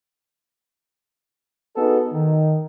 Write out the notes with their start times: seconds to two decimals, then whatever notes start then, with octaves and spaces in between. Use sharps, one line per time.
1.76 B3 D#4 F#4 G#4 A4
2.13 D#3